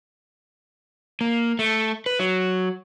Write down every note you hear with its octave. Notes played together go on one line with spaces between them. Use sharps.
A#3
A3
B4
F#3